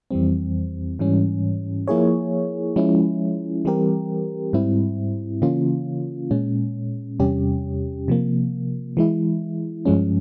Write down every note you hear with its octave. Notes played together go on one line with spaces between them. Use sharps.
F2 E3 G3 C4
G#2 E3 G3 C#4
F3 A#3 E4 G#4 C#5
F3 G#3 C#4 E4
E3 G3 C4 G4 A#4
G#2 G3 C4 E4
C#3 E3 A#3 C#4 F4
A#2 G#3 C#4
E2 C3 G3 C#4 G4
C3 F3 A#3
E3 G#3 E4
G2 F3 G#3 C#4